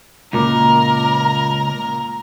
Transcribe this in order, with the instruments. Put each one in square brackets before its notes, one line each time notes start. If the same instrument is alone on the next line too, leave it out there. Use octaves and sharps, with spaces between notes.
[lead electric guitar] C#2 [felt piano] A#2 A#3 D6 [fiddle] A#4 [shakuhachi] A#5